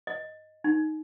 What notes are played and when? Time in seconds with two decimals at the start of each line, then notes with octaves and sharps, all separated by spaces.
0.07 D#5
0.64 D#4